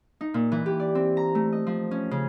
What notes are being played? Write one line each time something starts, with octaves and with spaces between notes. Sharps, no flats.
D#4
A#2
E3
G4
D5
C4
A#5
A3
D#5
F3
C#4
C#3